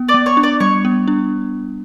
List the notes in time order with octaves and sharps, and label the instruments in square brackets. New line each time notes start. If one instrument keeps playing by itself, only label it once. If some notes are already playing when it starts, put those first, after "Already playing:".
Already playing: [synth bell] B3
[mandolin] D5 D6
[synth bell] B3
[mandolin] C#5 C#6
[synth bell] D4
[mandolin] D5 D6
[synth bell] G3 [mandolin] C#5 C#6
[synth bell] B3
D4